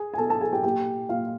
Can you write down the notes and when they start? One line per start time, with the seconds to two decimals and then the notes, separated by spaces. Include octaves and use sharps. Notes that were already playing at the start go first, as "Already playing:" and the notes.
Already playing: G#4 G#5
0.14 G#5
0.18 B2 A4 A5
0.29 A4 A5
0.41 G#4 G#5
0.52 G4 G5
0.63 A#2 G4 G5
1.09 A#2 F4 F5